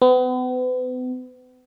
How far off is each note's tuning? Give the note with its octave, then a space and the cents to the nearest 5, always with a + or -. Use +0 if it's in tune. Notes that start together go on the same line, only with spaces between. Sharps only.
B3 +40